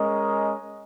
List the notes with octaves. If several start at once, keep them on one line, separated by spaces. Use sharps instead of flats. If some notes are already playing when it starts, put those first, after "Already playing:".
Already playing: G#3 C#4 A#4 D#5